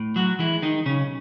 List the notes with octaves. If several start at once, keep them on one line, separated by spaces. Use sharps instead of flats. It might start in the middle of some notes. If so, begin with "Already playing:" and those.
Already playing: A2
F#3 F#4
E3 G#3 E4
D#3 D#4
B1 C#3 C#4